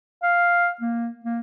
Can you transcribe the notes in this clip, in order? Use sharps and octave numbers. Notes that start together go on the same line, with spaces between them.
F5
A#3
A#3